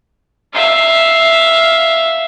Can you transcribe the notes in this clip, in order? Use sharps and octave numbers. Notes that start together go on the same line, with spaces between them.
E5 F5